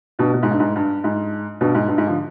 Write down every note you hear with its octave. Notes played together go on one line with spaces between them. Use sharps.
G2 B2
B2
G#2
G2
G#2
G2
G#2
G2 B2
G#2
G2
G#2
D3 F3